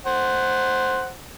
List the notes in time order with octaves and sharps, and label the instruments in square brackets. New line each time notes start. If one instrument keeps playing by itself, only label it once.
[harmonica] C5 F#5